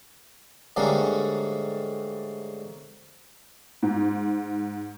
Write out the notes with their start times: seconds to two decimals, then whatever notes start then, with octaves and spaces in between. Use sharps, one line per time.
0.76 G#2 D3 G3 A3 A#3 C#4
3.83 G#2